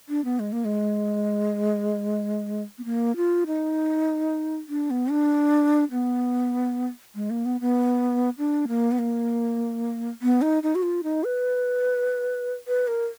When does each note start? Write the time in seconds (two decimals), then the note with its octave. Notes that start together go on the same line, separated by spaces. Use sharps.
0.09 D4
0.24 B3
0.39 G#3
0.52 A#3
0.65 G#3
2.78 B3
2.85 A#3
3.16 F4
3.46 D#4
4.69 D4
4.90 B3
5.10 D4
5.92 B3
7.15 G#3
7.30 A#3
7.45 B3
7.61 B3
8.38 D4
8.68 A#3
8.92 B3
8.99 A#3
10.22 B3
10.42 D#4
10.63 D#4
10.75 F#4
10.82 F4
11.03 D#4
11.24 B4
12.68 B4
12.87 A#4